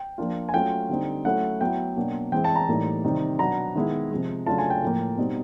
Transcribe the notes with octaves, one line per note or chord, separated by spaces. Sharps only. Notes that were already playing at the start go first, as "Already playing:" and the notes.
Already playing: G5
F3 A#3 D4 F4
G#5
F#3 A3 C#4 F4 G5
D3 G3 C4 D#4
F#3 A3 C#4 E4 F#5
F#3 B3 E4 G5
B2 F#3 A#3 D4
E3 G#3 C4 E4 G5
A5
A#5
A2 E3 G3 A#3 D#4
C3 D#3 G3 C4 D#4
B2 F#3 B3 D4 A#5
D#3 G#3 B3 E4
C3 F3 G#3
C#3 F#3 A3 D4 F4 A5
G#5
G5
A2 F3 A#3
B2 G3 C4 D#4